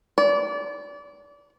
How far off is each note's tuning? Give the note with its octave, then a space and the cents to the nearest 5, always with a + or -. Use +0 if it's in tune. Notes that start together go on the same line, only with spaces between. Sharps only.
D5 -30